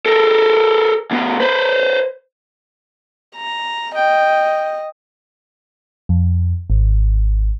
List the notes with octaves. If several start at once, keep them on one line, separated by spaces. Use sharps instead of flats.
A4 A#4
D2 B3
B4 C5
A#5
D#5 G5
F2
G#1